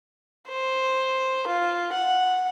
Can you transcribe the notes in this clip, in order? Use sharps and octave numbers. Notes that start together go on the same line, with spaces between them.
C5
F4
F#5